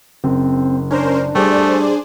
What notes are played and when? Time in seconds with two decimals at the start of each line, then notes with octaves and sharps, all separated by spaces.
0.24 F#1 C4
0.91 C#4 D4 A#4 C5
1.35 G3 A3 G#4 C5 D5